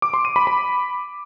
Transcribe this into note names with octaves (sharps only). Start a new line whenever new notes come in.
D6
C6
D#7
B5
B5